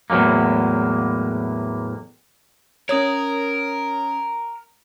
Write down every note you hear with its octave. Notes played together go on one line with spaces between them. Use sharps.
E2 A2 F#3 G#3 A#3
C#4 A#4 C#5 D#6 G#6